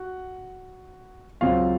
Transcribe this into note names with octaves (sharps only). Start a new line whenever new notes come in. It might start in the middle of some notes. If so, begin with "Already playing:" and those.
Already playing: F#4 F#5
C#2 C#3 F#3 C4 F4 F5